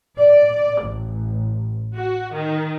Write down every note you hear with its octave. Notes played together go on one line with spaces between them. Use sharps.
D5
A1
F#4
D#3